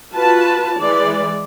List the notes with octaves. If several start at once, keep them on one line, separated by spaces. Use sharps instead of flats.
F4 F#4 B4 A5
E3 G#3 D5